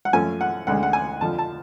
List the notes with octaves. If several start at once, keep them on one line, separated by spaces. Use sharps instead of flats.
F#5
F#2 F3 A3 C#4 G#5
F#5
D2 D3 G#3 C#4 F#5
F#5
G#5
F2 D3 F3 A5
A5